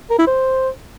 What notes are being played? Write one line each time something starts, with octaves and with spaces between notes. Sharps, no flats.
A#4
E4
C5